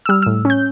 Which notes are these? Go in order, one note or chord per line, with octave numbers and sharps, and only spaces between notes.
E6
G3 F6
E6
A2
C#4 G6